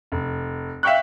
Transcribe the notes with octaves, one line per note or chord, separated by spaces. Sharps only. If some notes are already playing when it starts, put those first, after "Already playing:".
F1
E5 F5 G5 C#6 F#6